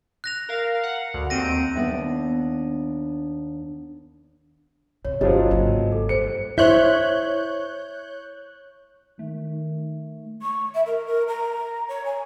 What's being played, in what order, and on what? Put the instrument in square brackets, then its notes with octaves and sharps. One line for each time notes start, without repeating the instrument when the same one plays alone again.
[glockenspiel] F#6 A#6 F7
[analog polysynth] A#4 F5
F#5
D2
[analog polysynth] D#2 C4 D7 [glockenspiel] A#6 D#7
[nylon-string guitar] D#2 B3 D4 D5 E5
[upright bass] C3 [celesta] C#5
[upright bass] G1 [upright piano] C#3 F3 F#3 [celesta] C5 D#5
[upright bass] G#1 A#3
[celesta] A4
[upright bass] G2 [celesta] C5 [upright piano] C#7
[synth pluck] E4 C5 [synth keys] C#5 F#6 G6 [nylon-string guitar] E5
[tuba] D#3 [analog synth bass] A3
[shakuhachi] C#6
E5
A#4
A#4
A#5
C#5
G#5